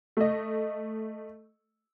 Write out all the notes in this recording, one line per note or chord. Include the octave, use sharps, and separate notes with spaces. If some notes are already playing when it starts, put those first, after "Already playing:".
A3 D#5